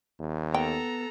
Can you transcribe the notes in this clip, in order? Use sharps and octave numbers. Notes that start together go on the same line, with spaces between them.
D#2
B3 A4 G5 A#5